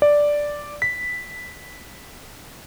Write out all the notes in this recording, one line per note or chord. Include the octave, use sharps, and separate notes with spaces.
D5
B6